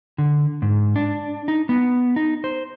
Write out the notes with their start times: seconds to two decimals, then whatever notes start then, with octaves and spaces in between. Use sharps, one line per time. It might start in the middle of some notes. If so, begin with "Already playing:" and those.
0.18 D3
0.62 G#2
0.96 D4
1.48 D#4
1.69 B3
2.16 D#4
2.44 C5